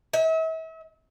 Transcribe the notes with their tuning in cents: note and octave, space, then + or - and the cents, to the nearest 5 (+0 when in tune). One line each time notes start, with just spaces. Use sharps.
E5 -40